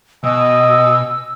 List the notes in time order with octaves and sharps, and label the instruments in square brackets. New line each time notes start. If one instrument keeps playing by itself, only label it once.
[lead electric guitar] B2 [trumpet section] D#5 G#5 [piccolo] E6